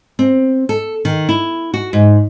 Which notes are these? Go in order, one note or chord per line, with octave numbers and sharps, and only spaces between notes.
C4
A4
D#3
E4
F#4
G#2